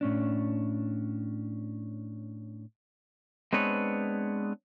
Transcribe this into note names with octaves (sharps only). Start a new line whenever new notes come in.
A2 C#4 D4
G#3 B3 C4 D4 B4 C#5